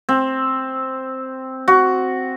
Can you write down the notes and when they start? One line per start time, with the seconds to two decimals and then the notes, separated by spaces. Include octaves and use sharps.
0.09 C4
1.68 F#4